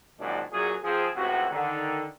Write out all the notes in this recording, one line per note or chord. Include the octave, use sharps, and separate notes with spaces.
A#1 F#2 A#2 D#3 G#3 D4
F#2 A#2 F#3 G#4
F3 C4 G#4
C#2 A2 C3 F#4
D3 D#3